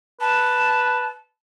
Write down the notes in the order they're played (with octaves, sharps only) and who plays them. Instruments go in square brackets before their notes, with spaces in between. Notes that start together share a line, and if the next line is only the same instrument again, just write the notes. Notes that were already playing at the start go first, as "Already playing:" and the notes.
[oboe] B4 [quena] A5